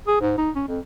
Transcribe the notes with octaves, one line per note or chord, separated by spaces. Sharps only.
G#4
G#2
D#4
C#4
F2